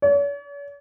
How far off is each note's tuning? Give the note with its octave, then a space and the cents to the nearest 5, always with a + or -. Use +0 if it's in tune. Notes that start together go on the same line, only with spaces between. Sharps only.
C#5 +45